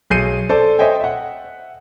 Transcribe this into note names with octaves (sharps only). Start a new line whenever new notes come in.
B1 G#4 G6 C7 C#7 D#7
A4 C5 D5 A5
C5 C#5 D#5 E5 G5 G#5
E5 F#5